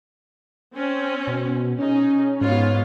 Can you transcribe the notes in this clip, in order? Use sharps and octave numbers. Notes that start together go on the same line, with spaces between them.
C4 C#4
B2
C#4 D#4 G#4
G#2 B3 F4 C#5